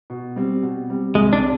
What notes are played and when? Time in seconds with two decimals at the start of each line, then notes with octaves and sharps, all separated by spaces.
0.10 B2
0.36 G3 C4
0.62 B2
0.90 G3 C4
1.15 C2 G#3
1.33 D4
1.41 C3